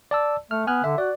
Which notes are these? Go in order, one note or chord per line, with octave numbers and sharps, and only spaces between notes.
D5 A5 E6
A3 F6
B3 G#5 F6 F#6
D3 E5
F#4 D5